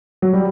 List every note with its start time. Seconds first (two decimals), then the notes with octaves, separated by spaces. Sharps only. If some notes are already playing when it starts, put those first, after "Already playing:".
0.22 F#3
0.33 G3